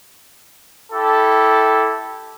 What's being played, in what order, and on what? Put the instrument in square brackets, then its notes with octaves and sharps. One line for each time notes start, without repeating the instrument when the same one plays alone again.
[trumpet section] E4 G4 A4